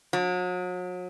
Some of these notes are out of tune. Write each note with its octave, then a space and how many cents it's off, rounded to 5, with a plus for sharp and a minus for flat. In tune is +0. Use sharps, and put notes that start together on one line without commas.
F#3 -40